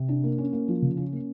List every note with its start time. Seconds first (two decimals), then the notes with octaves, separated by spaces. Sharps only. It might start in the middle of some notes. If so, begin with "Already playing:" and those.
Already playing: C3
0.08 D4
0.24 A#3
0.38 C#4
0.53 A#3
0.68 F3
0.82 C#3
0.97 C#4
1.12 A#3